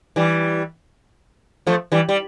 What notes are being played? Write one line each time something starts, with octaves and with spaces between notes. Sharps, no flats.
E3 G3
F3 A3
E3 G3
G3